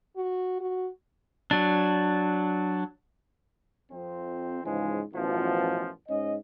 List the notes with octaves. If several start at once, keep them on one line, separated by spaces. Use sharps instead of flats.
F#4
F#4
F#3 D4
F2 C4
G#2 C#3 E3 F3 G#3
A1 F#2 B2 F3
G#2 C#4 D#5